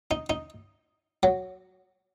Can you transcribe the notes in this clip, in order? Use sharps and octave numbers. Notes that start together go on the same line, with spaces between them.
D#4
D#4
F#3